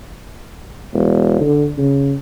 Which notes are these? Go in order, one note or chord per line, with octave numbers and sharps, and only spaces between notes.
E1
D3
C#3